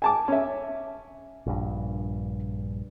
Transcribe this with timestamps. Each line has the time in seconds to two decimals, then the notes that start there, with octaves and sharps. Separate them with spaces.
0.02 G#5 A5 D6
0.28 C#4 E5
1.46 A#1 G2